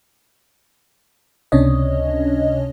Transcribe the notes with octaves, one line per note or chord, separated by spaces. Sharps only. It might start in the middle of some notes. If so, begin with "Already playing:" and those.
C#2 C3 C#4 D4 C#5 D#5